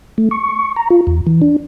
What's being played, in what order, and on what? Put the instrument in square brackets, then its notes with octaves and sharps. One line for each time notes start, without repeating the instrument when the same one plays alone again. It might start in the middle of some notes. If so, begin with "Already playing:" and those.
[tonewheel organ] A3
C#6
A#5
F4
E2
E3
D4